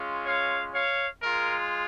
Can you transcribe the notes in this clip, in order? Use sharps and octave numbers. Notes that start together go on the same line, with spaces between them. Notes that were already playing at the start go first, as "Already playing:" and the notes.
Already playing: G#3 C#4 F4
C#5 F5
C#5 F5
G#3 F4 A#4